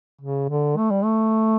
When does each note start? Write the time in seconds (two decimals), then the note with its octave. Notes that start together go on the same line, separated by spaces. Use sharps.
0.21 C#3
0.49 D3
0.77 A3
0.90 G3
1.03 A3